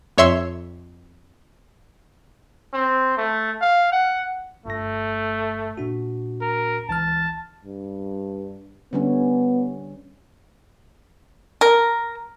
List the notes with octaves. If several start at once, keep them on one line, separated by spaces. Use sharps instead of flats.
F2 C#5 E5 C6 E6
C4
A3
F5
F#5
G1 G2 A3 A#6
A#2 D4 F#4
A#4
C#2 E3 A5 F6
G2
D3 G3 B3 C#4
A#4